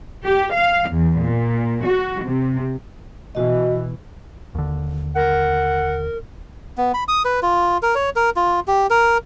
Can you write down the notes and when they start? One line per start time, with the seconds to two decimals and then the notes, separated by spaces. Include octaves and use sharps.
0.24 G4
0.54 F5
0.90 E2
1.20 A#2
1.85 F#4
2.24 C3
3.35 B2 E3 F#4 D#5
4.55 D#2 D3
5.16 A#4 F#5
6.78 B3
6.94 B5
7.08 D#6
7.25 B4
7.43 F4
7.83 A#4
7.95 C#5
8.16 A#4
8.36 F4
8.68 G4
8.90 A#4